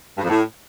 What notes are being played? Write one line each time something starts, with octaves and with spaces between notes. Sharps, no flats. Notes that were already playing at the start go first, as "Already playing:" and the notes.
G2
F2
A2